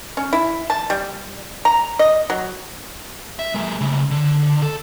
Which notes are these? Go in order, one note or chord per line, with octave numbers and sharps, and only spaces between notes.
C#4
E4
A5
G3
A#5
D#5
F#3
E5
G#3 A#3
C#3 A3
D3
A4